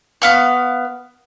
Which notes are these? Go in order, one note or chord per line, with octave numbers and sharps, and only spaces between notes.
B3 F5 C#6